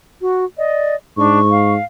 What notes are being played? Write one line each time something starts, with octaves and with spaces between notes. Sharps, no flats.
F#4
D5 D#5
G#2 D4 C#6
F5